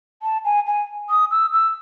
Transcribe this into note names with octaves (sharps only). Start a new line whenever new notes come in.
A5
G#5
G#5
D#6
E6
E6